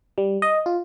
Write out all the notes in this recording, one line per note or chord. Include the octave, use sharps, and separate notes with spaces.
G3
D#5
F4